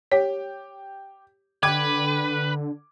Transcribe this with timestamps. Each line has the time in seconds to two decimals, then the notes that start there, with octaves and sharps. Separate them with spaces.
0.12 G4 C#5
1.63 D3 B4 G5 D6 G#6